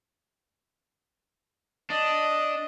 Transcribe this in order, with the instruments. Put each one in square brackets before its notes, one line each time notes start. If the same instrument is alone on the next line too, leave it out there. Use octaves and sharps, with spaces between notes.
[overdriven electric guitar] D4 [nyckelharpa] D#5